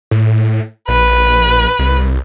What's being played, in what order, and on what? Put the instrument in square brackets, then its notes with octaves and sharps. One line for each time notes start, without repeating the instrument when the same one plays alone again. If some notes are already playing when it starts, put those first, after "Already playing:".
[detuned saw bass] A2
[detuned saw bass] A#1 [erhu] B4
[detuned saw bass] C2